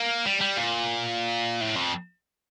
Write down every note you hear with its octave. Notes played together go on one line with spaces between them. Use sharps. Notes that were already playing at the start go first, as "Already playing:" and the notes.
Already playing: A#3
G3
G3
A#2
A2
F2